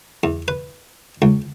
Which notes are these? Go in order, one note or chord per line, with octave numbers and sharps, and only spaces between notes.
E2
B4
C#2